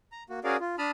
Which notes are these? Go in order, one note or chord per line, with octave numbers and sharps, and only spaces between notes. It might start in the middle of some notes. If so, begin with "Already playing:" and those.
A#5
A#3 F#4
C#4 F#4 G#4 A#4 D5 F5
F4
D4 A5 B5 D#6 F6